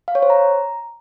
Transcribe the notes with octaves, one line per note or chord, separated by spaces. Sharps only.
F5
C#5
C5
A#5